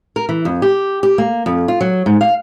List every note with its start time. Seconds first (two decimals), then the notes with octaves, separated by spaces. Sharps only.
0.16 A#4
0.29 E3
0.45 F2
0.62 G4
1.03 G4
1.18 A#3
1.46 F2
1.68 F4
1.81 F#3
2.06 G#2
2.21 F5